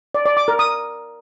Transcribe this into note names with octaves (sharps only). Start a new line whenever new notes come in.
D5
D5
D6
A#4
D#6